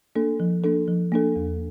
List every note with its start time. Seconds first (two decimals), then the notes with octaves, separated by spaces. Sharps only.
0.15 A#3 D4 A4
0.40 F3
0.64 A#3 D4 A4
0.87 F3
1.12 A#3 D4 A4
1.36 E2